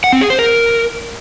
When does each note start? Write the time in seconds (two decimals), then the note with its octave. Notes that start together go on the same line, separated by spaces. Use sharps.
0.04 F#5
0.13 C4
0.21 G#4
0.30 C5
0.39 A#4